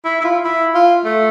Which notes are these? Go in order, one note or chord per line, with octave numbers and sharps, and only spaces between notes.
E4
E4
F4
E4
F4
A3